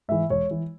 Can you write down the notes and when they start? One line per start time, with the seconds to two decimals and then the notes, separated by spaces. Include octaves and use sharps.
0.08 G#2 E3 E5
0.29 E1 C#5
0.51 E3